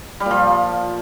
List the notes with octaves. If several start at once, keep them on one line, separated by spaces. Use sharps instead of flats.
G3
A#2
F3